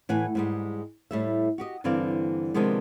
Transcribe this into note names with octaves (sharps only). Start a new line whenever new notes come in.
A2 E3 F#5 G#5
G#2 G3 G#3
A2 G3 E5
F#4 G4 D#5
G2 D3 E3 C4 D5 F5
C3 D#3 F3 G#3 B3 D4